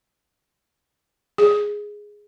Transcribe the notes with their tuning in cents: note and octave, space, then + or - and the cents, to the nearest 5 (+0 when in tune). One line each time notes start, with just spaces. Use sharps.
G#4 +0